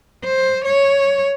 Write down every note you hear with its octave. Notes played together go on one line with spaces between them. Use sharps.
C5
C#5